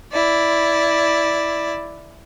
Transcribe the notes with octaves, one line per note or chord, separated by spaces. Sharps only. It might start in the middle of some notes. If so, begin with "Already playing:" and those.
E4 D5